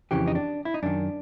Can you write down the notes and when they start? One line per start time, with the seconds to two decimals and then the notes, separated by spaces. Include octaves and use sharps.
0.11 F2 C#3 E3 G4
0.27 D#4
0.35 D4
0.65 E4
0.74 D#4
0.83 F#2 D#3 D4